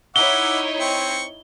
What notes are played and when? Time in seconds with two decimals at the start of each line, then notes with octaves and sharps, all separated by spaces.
0.16 D#4 E4 C#5 E5 F#5 D6 G7
0.80 C4 C#6